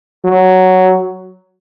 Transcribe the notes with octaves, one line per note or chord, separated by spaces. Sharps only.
F#3